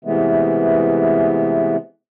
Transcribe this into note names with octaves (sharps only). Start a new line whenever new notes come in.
C3 E3 G#3 A3 B3